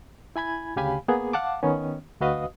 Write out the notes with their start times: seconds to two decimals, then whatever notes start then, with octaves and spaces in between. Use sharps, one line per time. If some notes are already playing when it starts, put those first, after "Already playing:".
0.36 E4 G#5 B5 G#6
0.76 D2 C#3 G4 F5 G#5 B5
1.08 A#3 B3 G#4
1.33 F5 F#5 A5 D6
1.63 D#3 B3 C#4
2.21 D2 F#4 B4 D#5 F5 D#6